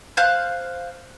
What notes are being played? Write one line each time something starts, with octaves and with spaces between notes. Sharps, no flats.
C5 F5 F6 F#6